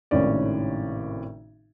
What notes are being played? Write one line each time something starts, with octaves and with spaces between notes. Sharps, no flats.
G#1 A2 C3 D#3 C#4 D5